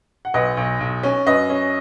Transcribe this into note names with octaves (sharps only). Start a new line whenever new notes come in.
F#5
B1 B4 D#5
B1
B1
C#4
F#2 B4 D#5
C#4